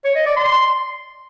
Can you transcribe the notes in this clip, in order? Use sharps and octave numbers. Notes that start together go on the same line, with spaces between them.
C#5
D#5
D5
C6